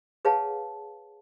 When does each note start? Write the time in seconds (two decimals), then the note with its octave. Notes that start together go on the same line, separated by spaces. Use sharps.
0.25 G#4 B4 C#5 F5 F#5 A5